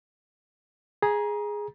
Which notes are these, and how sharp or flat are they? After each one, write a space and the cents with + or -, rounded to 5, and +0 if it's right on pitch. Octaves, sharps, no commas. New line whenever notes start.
G#4 +0 A#5 +25